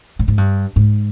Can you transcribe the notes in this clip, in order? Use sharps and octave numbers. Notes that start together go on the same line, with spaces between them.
A2
G#2
G2
G#2